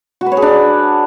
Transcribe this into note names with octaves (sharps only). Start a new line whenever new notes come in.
F#4
B4
C#5
G#4
D4